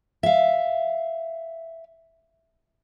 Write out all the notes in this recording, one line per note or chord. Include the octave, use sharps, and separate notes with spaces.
E5 F5